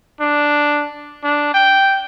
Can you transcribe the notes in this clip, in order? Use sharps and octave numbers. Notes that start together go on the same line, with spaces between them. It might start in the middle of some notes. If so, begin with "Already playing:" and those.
D4
D4
G5